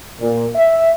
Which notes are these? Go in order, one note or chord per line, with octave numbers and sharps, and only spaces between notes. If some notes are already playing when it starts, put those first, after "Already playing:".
A#2
E5